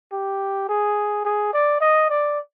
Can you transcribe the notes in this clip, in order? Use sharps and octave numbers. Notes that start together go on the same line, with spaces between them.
G4
G#4
G#4
D5
D#5
D5